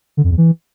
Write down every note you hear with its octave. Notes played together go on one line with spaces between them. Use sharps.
D3
F2
E2
E3